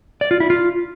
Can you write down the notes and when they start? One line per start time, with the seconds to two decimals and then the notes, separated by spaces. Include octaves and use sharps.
0.21 D5
0.31 F4
0.40 E4
0.50 F4